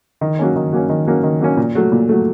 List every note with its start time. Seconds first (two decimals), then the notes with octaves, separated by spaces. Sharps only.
0.21 D#3
0.39 F#3 A#3 C#4
0.56 D#3
0.72 F#3 A#3 C#4
0.89 D#3
1.07 F#3 A#3 C#4
1.23 D#3
1.40 F#3 A#3 C#4
1.57 A#2
1.75 F#3 A3
1.92 A#2
2.09 F#3 A3